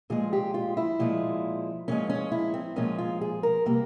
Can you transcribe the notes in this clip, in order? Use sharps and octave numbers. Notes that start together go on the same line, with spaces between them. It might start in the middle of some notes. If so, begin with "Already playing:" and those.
A#2 F3 G#3 G#4
G4
F4
E4
A#2 F3 G#3
A#2 F3 G#3 C#4
C#4
E4
C4
A#2 F3 G#3 C#4
F4
G#4
A#4
C3 G3 A#3